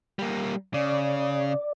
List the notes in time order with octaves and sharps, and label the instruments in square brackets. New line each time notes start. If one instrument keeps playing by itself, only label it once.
[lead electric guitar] G3 A#3
[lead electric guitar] C#3 [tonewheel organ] D5